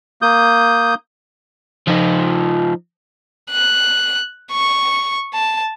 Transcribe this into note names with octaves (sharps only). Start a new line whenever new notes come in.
A#3 D#6 G6
F3 D#4
F#6
C#6
A5